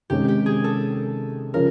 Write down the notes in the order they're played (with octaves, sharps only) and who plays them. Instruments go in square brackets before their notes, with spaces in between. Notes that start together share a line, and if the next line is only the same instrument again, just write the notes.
[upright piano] C3 D#3 G#3 C#4 [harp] G4
[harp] G4
G#4
A4
[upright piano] C#3 F3 C#4 [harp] A#4